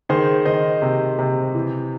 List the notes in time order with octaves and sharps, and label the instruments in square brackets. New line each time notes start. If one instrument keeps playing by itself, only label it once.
[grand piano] D#3 G#4 C5
D#3 C5 D#5
C3
C3
E3